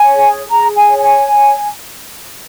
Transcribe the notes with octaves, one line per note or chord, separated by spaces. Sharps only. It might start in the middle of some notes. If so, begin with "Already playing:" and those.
Already playing: C#5 G#5
G#4
G#4 A#5
G#5
C#5
G#5